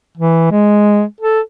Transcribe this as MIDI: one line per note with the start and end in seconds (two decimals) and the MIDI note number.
0.17 0.47 52
0.52 1.03 56
1.21 1.40 69